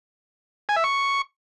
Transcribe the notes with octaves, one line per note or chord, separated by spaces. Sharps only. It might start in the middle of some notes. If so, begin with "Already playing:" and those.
G#5
E5
C#6